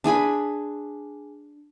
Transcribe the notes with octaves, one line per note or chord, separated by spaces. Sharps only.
D4 G#4 G#5 B5